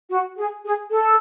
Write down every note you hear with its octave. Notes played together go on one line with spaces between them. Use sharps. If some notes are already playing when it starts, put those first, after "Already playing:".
F#4
G#4
G#4
A4